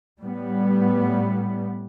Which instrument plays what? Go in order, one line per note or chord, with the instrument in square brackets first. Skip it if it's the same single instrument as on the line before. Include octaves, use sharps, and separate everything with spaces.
[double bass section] A2 G3 B3